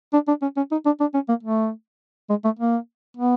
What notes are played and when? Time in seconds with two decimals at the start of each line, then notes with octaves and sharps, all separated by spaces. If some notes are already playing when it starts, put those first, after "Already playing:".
0.13 D4
0.28 D4
0.42 C#4
0.56 C#4
0.71 D#4
0.85 D4
1.00 D4
1.14 C#4
1.28 A#3
1.43 A3
2.29 G#3
2.44 A3
2.59 A#3
3.17 B3